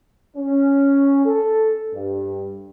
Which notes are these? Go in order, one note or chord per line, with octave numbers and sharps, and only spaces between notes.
C#4
A4
G2